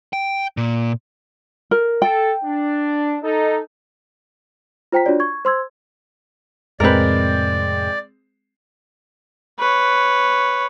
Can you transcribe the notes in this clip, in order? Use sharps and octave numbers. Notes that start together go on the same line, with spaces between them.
G5
A#2
A#4
A4 G5
D4
D#4 A4
F4 C5 G5 A#5 B6
D4 F4 F#4 C#5 D5
C#6 G#6
C5 C6 E6 G#6
F2 A2 C3 G#3 C4 A#4 B4 D5
B4 C#5